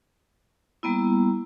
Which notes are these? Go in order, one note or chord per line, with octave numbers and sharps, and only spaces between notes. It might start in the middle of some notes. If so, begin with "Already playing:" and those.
G3 A#3 B3 E4